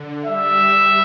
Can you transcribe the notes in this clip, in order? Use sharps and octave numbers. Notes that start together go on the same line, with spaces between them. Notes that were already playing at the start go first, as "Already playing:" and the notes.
Already playing: D3
G3 E5